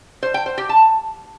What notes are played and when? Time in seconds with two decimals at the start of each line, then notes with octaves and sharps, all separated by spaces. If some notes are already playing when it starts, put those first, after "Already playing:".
0.23 C5
0.34 G5
0.46 C5
0.58 G4
0.69 A5